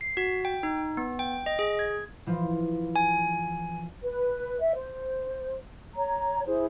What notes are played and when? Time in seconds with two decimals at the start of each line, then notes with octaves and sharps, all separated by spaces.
0.01 C7
0.17 F#4
0.45 G5
0.63 D#4
0.97 B3
1.19 G5
1.46 D#5
1.59 G#4
1.79 G#6
2.26 E3 F3
2.96 G#5
4.02 B4
4.60 E5
4.75 C5
5.96 C#5 A#5
6.46 E4 G#4 C5